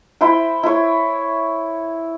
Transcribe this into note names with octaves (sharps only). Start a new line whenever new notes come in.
E4 C5 G5
E4 C#5